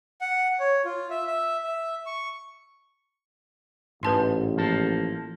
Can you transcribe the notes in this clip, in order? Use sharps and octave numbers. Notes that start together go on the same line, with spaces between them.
F#5
C#5
F4
E5
E5
E5
C#6
A1 G#2 B4 A5 C6
F3 A#3 A4